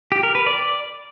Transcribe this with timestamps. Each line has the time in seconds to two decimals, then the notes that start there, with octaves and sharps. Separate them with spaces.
0.12 G4
0.23 A#4
0.35 B4
0.47 D5